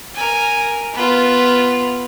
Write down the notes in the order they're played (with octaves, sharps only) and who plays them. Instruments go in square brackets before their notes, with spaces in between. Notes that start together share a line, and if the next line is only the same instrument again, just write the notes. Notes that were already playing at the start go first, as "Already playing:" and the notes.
[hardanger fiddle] A#4 G#5
B3 F4